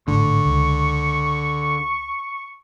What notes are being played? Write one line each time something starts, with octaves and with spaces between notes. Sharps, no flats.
G#1 A2 D3 C#6
C#2